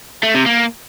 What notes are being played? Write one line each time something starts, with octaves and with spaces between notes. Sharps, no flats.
A3
C3
A#3